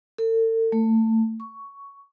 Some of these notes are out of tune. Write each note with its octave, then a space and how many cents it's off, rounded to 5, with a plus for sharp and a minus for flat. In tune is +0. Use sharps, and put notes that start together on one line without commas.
A4 +40
A3 +25
C#6 +10